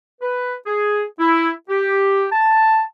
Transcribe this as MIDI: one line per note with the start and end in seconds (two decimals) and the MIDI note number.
0.21 0.54 71
0.66 1.04 68
1.19 1.50 64
1.69 2.25 67
2.31 2.82 81